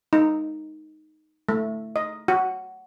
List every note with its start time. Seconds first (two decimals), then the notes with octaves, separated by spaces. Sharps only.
0.13 D#4
1.49 A3
1.96 D#5
2.28 F#4